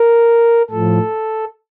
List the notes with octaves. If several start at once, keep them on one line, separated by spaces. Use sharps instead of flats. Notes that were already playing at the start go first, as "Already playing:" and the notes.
Already playing: A#4
A2 F3 A4